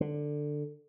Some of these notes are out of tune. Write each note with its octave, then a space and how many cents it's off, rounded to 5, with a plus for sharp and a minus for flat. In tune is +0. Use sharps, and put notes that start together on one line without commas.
D3 +10